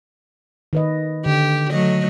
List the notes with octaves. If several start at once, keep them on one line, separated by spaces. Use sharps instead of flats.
D#3 B4 D#5
D3 G4
F#3 A3 D#5